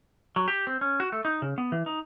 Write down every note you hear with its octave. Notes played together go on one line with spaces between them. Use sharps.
F#3
G4
C4
C#4
F#4
A3
D#4
C#3
B3
E3
D#4